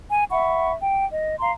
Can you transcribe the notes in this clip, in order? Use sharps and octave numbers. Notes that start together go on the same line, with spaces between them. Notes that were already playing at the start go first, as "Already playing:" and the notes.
G#5
E5 F#5 B5 C#6
G5
D#5
F5 A#5 C6